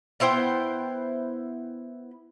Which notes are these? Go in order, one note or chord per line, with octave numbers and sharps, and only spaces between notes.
B3 E4 C5 G5